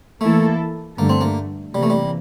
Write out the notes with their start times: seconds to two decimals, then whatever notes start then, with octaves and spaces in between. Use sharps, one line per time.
0.20 E3 A3 A#3 E4 A4
0.97 G2 D3 A3 A#3
1.09 C4
1.21 A#3
1.75 C3 E3 G3 A#3
1.83 A3
1.90 G3